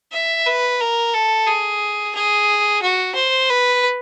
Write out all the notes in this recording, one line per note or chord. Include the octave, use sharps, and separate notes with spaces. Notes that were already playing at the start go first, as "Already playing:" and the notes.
E5
B4
A#4
A4
G#4
G#4
F#4
C5
B4